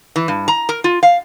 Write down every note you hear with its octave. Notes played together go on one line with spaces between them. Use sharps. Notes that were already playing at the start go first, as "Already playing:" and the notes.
E3
G2
A#5
A#4
F4
F5